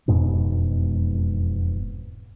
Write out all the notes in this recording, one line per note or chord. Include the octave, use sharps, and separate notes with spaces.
E1 F2 G#2 B2